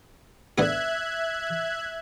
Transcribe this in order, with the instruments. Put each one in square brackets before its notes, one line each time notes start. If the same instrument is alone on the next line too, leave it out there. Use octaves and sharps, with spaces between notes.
[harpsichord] D3 B3 G#4 [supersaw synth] E5 F#6 G#6